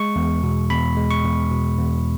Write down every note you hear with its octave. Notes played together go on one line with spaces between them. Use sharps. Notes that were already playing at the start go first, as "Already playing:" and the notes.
Already playing: G#3 C#6
E2
B2
E2 B5
G#3
C#6
E2
B2
E2